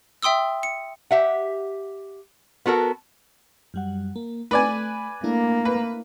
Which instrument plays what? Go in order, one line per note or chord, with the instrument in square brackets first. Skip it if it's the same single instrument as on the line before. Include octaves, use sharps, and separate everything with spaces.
[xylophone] E5 G5 C6 D#6 E6
C#7
[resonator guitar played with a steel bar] G4 E5 F#5
B3 F#4 A4 A#4
[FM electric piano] F#2 G3 F#5
A#3
[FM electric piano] A3 [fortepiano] B4 D5 G#5
[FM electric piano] A3 D4 E4 [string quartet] A#3
[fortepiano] B4